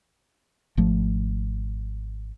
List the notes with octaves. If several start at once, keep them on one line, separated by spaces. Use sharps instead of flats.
G#1 F3 A3